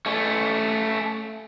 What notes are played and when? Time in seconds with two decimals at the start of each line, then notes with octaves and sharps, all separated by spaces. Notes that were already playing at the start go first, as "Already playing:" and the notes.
0.06 A3 C#4